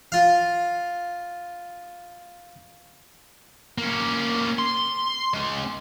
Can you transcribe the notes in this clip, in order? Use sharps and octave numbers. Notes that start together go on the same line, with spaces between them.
F4 F5
A#3 C#4
C6
G#3 C#4